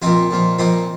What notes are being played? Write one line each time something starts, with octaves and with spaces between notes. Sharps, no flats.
A#2 F3 C4 D#4
A#2 F3
A#2 F3 C4 D#4